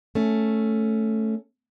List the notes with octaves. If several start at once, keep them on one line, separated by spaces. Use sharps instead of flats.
A3 C#4